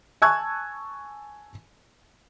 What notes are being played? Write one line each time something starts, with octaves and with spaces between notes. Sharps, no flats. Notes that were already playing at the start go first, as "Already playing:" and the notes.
G#5 A5 C#6 E6 F#6 G#6